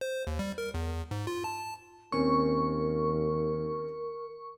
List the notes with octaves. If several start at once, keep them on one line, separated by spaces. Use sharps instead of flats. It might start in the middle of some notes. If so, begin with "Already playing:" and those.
C5
D#2
G3
A#4
E2
G#2
F4
A5
D#2 C4 C#4 A#4 C#6